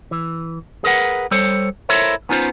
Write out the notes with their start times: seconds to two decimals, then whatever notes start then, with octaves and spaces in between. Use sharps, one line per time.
0.11 E3
0.84 G#4 A#4 B4 F#5
1.31 G3 A4 C5 C#5
1.89 E4 A4 A#4 C5 C#5 E5
2.29 B3 C#4 D#4 F4 B4 C5